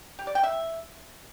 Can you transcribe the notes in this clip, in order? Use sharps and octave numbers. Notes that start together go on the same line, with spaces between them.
G4
D5
G5
E5